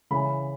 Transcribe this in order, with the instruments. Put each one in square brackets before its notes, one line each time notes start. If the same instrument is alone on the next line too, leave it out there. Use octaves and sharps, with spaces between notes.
[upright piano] C#3 E3 B5